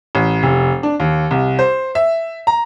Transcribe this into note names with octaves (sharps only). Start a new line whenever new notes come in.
A1
F1
D4
D#2
C2
C5
E5
A#5